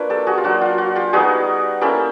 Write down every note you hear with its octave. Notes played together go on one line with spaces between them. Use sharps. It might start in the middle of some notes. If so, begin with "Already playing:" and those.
Already playing: A#3 D4 F4 B4 C#5
G4 A4
F#4 G#4
F4
F#3 A#3 D4 F#4
F4
F#4
F4 G4
G3 B3 D#4 F#4 G#4
A#3 C#4 E4 G4 A4